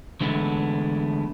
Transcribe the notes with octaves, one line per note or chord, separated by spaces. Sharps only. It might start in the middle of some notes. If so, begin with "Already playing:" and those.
D3 E3 G#3 A3 B3 E4